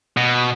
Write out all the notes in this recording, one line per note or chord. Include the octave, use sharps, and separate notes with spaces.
B2